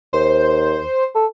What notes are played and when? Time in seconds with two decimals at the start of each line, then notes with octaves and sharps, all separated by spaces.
0.13 D#2 C5
1.15 A4